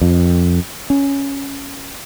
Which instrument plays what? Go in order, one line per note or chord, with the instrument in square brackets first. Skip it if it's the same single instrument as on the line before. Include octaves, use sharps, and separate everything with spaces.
[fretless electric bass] F2
C#4